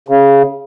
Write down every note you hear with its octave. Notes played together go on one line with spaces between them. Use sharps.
C#3